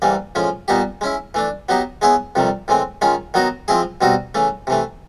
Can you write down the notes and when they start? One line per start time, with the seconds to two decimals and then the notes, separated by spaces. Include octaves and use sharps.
0.02 G#2 E3 G3 A#3
0.35 A2 F3 G#3 C#4
0.68 A#2 G3 B3 D#4 G4
1.01 G#3 C#4 E4
1.34 E3 A3 D4
1.69 F#3 B3 D#4 G4
2.02 G#3 B3 E4 G#4 C#5
2.35 F2 C3 D#3 G3
2.68 A2 E3 G#3 C4
3.01 D#3 G#3 C#4 F4
3.34 D#3 F#3 B3 D#4 F#4
3.68 F3 G#3 C4 E4 G#4
4.01 B2 G3 C4 D#4 F#4
4.35 C#3 E3 A3
4.67 C3 E3 A3